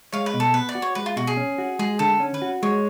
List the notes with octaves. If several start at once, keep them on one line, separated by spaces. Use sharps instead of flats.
G#3 C#5 F5
B4
B2
A4
B3 B4
D5
F#4
C#5
G#3 B4
F4
B2 F#4
G#4
C#4
F#4
G#3 G#4
D3 A4
C#4
B4
F#4
G#3 C#5